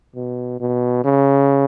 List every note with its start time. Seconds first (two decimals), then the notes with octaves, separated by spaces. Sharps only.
0.15 B2
0.60 B2
1.05 C#3